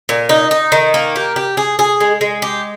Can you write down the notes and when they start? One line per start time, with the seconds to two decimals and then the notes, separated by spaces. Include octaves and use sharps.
0.09 A#2
0.29 D#4
0.51 D#4
0.72 D#3
0.94 A#3
1.16 G4
1.36 G4
1.57 G#4
1.79 G#4
2.00 G#3
2.21 G#3
2.42 G4